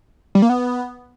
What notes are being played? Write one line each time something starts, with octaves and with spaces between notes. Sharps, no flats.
G3
A#3
B3